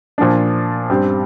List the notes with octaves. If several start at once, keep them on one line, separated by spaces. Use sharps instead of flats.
A#2 F3 D4
G2 G3 C4 G4